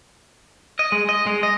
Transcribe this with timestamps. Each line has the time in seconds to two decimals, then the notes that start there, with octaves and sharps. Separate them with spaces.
0.79 D#5
0.92 G#3
1.09 D#5
1.27 G#3
1.43 D#5